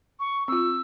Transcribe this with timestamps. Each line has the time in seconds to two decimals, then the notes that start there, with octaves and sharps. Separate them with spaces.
0.20 C#6
0.48 C4 F4 E6